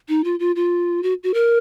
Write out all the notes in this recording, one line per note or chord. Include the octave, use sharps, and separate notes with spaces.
D#4
F4
F4
F4
F#4
F#4
A#4